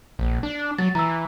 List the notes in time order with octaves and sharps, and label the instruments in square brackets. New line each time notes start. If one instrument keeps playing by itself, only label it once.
[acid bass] A#1
D4
[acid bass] F#3 [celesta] A6
[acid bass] E3 [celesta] A#5 E6